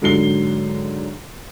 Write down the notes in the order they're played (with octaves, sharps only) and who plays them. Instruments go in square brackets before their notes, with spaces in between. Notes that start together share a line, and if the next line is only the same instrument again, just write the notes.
[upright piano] G#2 D3 F#3 C7 G7